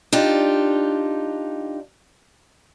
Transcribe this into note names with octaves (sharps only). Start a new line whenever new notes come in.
D4 D#4 F4 G4